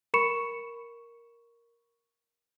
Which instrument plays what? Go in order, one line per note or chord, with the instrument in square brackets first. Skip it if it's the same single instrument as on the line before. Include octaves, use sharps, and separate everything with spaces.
[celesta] A#4 B5 C#6 C#7 E7